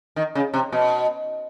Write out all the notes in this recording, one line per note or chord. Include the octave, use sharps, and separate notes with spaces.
D#3
C#3
C3
B2